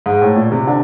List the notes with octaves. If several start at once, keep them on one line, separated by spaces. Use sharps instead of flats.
G#2
A2
A#2
C3
D3